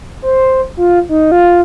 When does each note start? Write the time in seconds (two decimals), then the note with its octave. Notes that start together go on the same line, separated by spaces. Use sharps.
0.22 C5
0.77 F4
1.09 D#4
1.32 F4